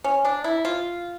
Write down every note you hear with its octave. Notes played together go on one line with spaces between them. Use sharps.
C#4
D4
E4
F4